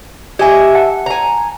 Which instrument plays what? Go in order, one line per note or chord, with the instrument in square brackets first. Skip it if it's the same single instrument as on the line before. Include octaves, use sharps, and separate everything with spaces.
[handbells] G4 G#5 [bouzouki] D#5 E5
[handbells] F#5 A5
[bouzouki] G#5 A#5